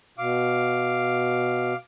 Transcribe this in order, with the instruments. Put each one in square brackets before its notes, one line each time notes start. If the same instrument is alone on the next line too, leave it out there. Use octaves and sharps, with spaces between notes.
[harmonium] B2 [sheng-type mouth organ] F5 D6